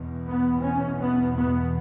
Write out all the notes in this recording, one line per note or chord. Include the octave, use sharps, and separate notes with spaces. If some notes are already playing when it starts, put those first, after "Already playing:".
Already playing: E2 B2
B3
C#4
B3
B3